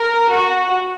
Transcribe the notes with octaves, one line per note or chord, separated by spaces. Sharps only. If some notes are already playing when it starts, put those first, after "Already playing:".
Already playing: A#4
F#4